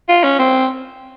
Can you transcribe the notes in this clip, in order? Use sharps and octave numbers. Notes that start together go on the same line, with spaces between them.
F4
C#4
C4